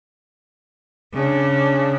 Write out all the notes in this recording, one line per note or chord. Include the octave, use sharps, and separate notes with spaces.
C#3 D4